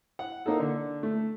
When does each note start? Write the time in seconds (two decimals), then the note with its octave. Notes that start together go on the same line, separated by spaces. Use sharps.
0.19 F#5
0.46 A#3 D#4 A4
0.60 D3
1.03 A3